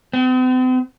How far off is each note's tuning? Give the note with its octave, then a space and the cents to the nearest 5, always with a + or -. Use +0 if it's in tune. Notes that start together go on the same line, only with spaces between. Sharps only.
C4 -45